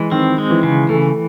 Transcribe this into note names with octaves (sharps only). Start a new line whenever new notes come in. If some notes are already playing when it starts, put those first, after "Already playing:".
Already playing: E3 G#3
D#3 C4
G#3
E3
C#3
E3 A3